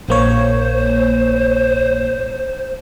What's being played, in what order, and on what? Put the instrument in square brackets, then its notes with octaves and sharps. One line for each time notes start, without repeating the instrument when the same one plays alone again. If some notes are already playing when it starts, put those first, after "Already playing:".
[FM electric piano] A#1 A#3 C#5 [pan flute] C5